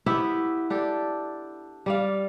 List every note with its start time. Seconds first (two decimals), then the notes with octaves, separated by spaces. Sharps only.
0.06 B3 E4 G4 E5
0.70 D4 G4 A4
1.86 G3 D5 F5